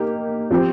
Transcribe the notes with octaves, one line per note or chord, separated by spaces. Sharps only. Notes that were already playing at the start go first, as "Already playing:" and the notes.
Already playing: A#3 D#4 G4
F3 C4 G4